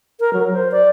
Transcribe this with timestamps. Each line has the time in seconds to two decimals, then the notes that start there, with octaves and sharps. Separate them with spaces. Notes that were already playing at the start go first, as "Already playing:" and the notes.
0.20 A#4
0.34 F#3
0.53 C5
0.72 D5